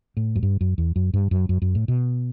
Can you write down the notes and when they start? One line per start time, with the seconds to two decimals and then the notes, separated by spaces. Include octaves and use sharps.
0.17 A2
0.36 F#2
0.43 G2
0.61 F#2
0.78 E2
0.96 F#2
1.14 G2
1.31 F#2
1.49 F#2
1.62 F#2
1.75 A2
1.88 B2